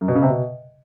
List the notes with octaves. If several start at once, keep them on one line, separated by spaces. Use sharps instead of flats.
F#2
B2
C#3
C3
B2